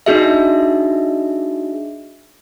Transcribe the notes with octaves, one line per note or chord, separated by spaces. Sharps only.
D4 D#4 F#4 G#4 D#5 E5